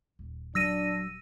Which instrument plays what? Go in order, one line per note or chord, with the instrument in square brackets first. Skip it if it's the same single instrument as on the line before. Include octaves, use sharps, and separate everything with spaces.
[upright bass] D#1
[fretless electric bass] F#3 [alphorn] D4 [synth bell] E6 A#6 D#7